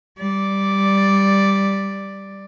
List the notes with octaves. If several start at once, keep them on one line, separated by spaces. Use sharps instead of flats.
G3 D5